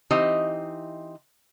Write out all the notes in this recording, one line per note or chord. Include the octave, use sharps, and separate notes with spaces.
E3 C4 D#4 G4 D#5